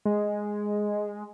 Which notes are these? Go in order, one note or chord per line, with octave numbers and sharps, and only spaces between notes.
G#3